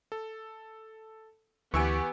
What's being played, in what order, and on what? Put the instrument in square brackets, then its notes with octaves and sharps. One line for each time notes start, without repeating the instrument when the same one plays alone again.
[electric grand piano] A4
[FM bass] D2 [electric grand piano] E3 E6 D7 [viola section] B3 G4 [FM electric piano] G#5 C#6